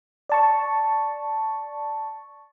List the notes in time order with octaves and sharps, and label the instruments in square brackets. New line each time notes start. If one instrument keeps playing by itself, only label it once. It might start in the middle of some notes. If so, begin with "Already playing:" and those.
[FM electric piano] D5 A5 C#6